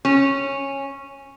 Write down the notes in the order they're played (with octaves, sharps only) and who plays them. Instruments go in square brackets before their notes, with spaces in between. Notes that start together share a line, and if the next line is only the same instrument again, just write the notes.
[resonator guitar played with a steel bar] C#4